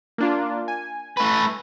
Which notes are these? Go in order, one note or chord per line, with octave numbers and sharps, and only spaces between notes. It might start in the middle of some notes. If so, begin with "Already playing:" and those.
A#3 D4 F4
G#5
A3 B4